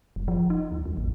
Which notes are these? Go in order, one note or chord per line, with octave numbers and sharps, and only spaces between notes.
F1
F3
D#4
D#2
E2
A1